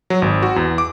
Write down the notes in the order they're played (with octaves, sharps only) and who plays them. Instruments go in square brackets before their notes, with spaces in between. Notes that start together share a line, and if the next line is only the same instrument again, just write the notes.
[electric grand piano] F#3
G#1
F#4
E2
D6